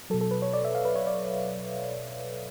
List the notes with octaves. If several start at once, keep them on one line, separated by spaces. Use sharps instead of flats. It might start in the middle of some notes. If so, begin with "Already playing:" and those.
B2 F#3 A4
A4
B4
C#5
D5
E5
F5
B4
C#5
D5